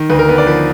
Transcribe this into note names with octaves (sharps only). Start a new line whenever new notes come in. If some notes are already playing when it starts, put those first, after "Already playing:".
Already playing: D#3
D2 B4
A#4
B3 B4
D5
F3 B4